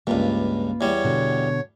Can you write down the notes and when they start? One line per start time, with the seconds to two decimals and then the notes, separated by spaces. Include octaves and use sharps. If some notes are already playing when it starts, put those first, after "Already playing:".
0.07 C#2 G2 A#3 F4 B4
0.81 E2 G3 C#5
1.04 B2 D3